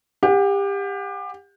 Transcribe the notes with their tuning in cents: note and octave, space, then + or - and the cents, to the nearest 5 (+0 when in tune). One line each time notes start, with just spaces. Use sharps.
G4 +25 F#5 -20